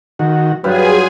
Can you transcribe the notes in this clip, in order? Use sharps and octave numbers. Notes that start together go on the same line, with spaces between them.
D#3 F#4
G2 F#3 F4 G#4 B4 C5 G#5